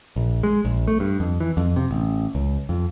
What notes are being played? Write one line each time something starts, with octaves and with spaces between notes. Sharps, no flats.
A#1
G#3
A#1
A3
G2
F2
E3
F2
C3
A1
C#2
F2